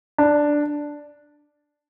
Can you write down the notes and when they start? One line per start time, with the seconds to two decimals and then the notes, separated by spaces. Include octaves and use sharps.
0.18 D4